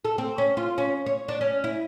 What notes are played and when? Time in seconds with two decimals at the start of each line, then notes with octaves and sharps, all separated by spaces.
0.05 A4
0.18 C4
0.38 C#4
0.57 F4
0.78 C#4
1.06 C#5
1.28 D4
1.41 C#4
1.64 E4